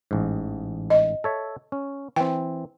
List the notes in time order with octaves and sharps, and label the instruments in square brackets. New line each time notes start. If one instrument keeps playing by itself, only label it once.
[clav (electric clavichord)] A1 G#2
[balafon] D#5
[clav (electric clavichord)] A4 C#5 E5
C#4
[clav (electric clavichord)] E3 C4 [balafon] G5